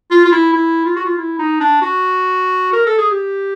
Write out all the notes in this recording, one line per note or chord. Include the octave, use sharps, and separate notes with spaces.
F4
F4
E4
E4
F4
F#4
F4
E4
D#4
D4
F#4
A#4
A4
G#4
G4